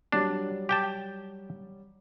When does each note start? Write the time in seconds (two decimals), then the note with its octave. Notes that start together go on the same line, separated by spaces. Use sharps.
0.12 F#3 G3 D4
0.69 G4 G5 A5